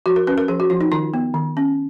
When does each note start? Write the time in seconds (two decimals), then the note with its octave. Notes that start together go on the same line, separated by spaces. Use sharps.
0.06 F3 F#4
0.16 A#4
0.27 C#4 B4
0.38 A#4
0.48 F3 G#4
0.60 F#4
0.70 F3 F4
0.81 D#4
0.92 D#3 F4
1.14 B3
1.34 D#3
1.57 C#4